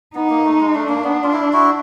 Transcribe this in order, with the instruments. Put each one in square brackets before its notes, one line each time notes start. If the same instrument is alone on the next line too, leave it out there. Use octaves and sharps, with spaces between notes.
[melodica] B3 [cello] D#4
[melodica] A#3
A3
G#3
[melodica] A3 [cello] D4
[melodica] A#3
B3
F4
E4
E4 F#4